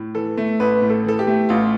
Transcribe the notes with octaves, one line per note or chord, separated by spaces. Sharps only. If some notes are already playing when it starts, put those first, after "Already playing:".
Already playing: A2
E3 A4
A3
A1 B4
A2
A4
E3 A4
G4
A3
A1 F4